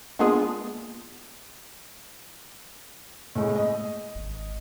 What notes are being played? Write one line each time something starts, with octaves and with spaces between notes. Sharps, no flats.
G#3 A#3 B3 D4 F4 G#4
A2 G#3
D#5
G#1